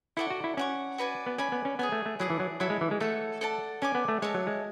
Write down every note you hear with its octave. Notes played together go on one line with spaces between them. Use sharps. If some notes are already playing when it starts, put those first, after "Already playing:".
E4 A4 D5 F#5 C#6
F#4
E4
C#4 D5 F#5 C#6
F#4 B4 D5 G#5
B3
C#4 D5 G#5 B5
B3
C#4
B3 G#4 C#5 G#5
A3
A3
F#3 E4 G#4 D5 A5
E3
F#3
F#3 E4 A4 E5 B5
G#3
E3
G#3
A3 A4 C#5 F#5
A4 D5 F#5 A5
C#4 D5 G#5 D6
B3
A3
G#3 C#5 E5 A5
F#3
G#3